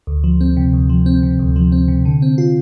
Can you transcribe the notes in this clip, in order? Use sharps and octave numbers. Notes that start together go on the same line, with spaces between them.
D2
F3
C4
C3
D2
F3
C4
C3
D2
F3
C4
C3
D3
C4
F4